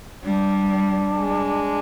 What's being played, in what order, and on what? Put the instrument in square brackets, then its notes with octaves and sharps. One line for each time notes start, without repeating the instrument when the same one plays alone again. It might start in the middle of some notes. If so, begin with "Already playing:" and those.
[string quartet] G3 [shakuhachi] D4
[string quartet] G#3